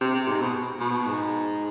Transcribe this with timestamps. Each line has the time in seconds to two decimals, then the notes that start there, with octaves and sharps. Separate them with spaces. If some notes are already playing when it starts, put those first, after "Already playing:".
0.01 C3
0.14 C3
0.28 G#2
0.41 B2
0.80 B2
1.07 G#2